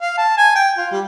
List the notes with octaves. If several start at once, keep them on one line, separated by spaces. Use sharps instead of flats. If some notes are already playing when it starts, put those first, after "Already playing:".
F5
A5
G#5
G5
F4
G3